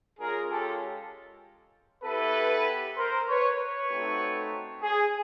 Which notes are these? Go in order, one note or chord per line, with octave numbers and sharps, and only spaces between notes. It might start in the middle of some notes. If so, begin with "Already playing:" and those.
G#3 C#4 F4 G#4 A#4
G4 A4
B3 E4 G4 A4 B4
A#4 C5
B4 C#5
B4 C#5
A3 C4 D#4 F#4
G#4